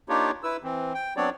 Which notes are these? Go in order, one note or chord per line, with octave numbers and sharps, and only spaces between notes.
A#3 D4 D#4 F4 G4 C#5
E4 B4 E6
E3 C4
G5
F#3 B3 C4 D4 C#5 D5